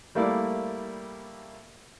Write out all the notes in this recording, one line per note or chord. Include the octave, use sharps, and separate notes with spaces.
G3 A3 A#3 E4 D5